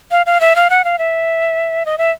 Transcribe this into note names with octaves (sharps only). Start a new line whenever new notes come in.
F5
F5
E5
F5
F#5
F5
E5
D#5
E5